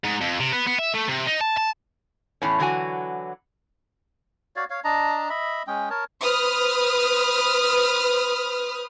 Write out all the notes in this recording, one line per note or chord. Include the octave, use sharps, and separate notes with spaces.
G#2
F2
C3
B3
B3
E5
A3
C3
D#4
A5
A5
E2 A2 C#4
D3 E3 F#3 F#4 G#5
F#4 C#5 D5 F5
C#5 F5
D4 D#5 A5 A#5
D#5 E5 B5
G#3 C#4 G5
A#4 C#5 A5
B4 C5 D#6 F6